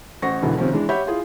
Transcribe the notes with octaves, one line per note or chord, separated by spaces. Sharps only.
A1 C5 F#5 C#6 A#6
E1 B1 B2 D3 E3 B3
C3 D#3 F3 C#4
E3 G#3 D4
G4 C#5 E5 F#5 B5 G6
E4 F4 G#4